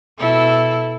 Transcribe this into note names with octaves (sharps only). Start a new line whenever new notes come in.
B2 E4 A4